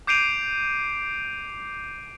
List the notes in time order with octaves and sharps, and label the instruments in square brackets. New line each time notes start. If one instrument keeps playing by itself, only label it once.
[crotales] D6 G6 C7 D7 D#7 F7